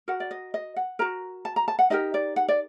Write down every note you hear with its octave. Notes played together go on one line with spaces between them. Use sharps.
F#4 A#4 F#5
D5
D#5
D#5
F#5
F#4 A#4 A#5
A5
A#5
A5
F#5
D#4 G4 A#4 D#5
D5
F#5
D5